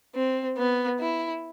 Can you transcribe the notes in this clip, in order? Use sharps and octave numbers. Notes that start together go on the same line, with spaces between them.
C4
B3
E4